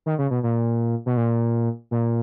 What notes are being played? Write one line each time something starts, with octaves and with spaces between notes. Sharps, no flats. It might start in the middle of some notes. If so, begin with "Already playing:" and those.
D#3
C#3
B2
A#2
B2
A#2
A#2